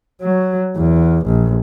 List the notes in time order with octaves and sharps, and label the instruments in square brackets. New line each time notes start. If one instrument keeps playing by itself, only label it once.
[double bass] F#3
E2
A#1